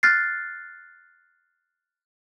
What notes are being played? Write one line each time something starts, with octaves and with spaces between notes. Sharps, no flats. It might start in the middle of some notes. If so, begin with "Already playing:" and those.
F6 F#6 A6 C7